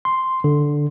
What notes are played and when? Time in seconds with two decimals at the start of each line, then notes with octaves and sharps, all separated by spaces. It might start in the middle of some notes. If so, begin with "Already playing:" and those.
0.05 C6
0.44 D3